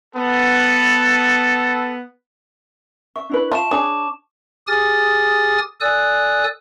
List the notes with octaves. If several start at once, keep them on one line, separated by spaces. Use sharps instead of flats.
B3 A4
E5 C#6
D4 E4 B4
F4 E5 A5 C#6 E7
D4 G#4 C#5 D6
G4 G#4 G#5 D#6 F6 A6
A4 D5 G#5 D#6 E6 F#6